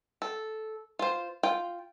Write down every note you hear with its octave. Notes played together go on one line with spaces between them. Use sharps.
A4
F4 C5
F4 G5